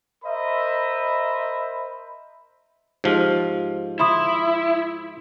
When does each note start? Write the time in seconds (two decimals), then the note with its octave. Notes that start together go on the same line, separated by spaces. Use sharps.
0.25 A#4 C5 D#5 E5 B5
3.04 G#2 F3 G4 F6
3.99 E4 B5 C6 D#6